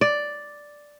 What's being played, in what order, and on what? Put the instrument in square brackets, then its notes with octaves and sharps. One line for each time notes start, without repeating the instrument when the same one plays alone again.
[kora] D5